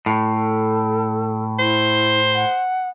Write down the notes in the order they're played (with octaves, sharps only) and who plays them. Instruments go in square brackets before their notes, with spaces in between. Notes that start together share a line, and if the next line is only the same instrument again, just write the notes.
[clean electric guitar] A2
[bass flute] A4
[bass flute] E4 [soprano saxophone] C5
[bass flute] F#5